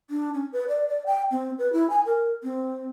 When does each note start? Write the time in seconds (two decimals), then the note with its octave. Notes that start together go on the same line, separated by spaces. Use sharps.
0.10 D4
0.34 C#4
0.53 B4
0.68 D5
0.89 D5
1.06 G5
1.31 C4
1.59 B4
1.73 E4
1.90 G#5
2.06 A#4
2.43 C4